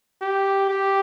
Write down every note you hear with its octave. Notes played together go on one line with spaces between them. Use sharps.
G4
G4